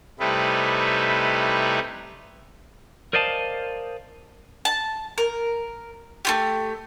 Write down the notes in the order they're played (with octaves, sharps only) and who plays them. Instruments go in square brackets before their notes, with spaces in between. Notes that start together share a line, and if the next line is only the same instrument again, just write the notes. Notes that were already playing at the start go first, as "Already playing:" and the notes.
[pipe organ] C3 G3 A3 D#4 E4 B4
[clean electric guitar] A#4 C5 D5 D#5 F5 A5
[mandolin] A5
A#4
A3 F4 G4